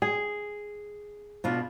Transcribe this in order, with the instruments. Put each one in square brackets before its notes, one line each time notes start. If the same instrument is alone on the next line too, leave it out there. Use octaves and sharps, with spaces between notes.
[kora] G#4
[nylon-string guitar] B2 D4 F4